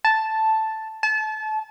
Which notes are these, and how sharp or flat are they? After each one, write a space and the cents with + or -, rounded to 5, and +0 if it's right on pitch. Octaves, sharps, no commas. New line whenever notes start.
A5 +0
A5 -30